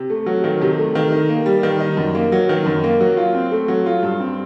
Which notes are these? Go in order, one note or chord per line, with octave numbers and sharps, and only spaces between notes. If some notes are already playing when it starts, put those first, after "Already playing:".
Already playing: C3
A3
F#3
D#3
C3
A3
D#3
D#4
A#3
G3
D#3
D#4
F#2
A#3
F#3
D#3
F#2
A#3
F#3
F4
C4
A3
F#3
F4
G2
C4